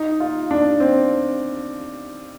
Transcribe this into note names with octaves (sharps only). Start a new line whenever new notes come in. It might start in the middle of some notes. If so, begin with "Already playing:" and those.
Already playing: D#4
F4
D4
C4